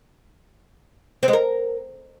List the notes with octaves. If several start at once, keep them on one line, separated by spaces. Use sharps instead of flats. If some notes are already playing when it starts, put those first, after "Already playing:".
C4
G#3
A#4